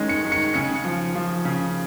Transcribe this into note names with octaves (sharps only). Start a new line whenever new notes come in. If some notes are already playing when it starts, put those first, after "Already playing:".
Already playing: D#3 G#3 C#4
C#7
D#3
C#7
C#3 C#7
F3
F3
C#3